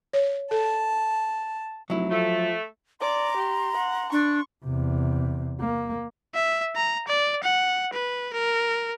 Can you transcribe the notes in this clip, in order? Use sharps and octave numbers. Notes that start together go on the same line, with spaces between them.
C#5
A4 A5
F1 F#3 E4
F3 A3
D5 A#5 C6 D6
G4
F#5
D4 C#6
E2 C3
A#3
E5
A#5
D5
F#5
B4
A#4